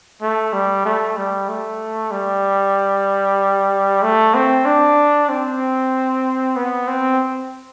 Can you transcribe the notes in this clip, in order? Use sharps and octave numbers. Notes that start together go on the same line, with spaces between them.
A3
G3
A3
G3
A3
G3
A3
C4
D4
C4
B3
C4